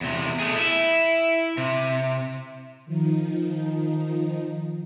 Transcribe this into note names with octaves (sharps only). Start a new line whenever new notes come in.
E2 C3
A3 G#4
E4 E5
C3
D#3 F3 D#4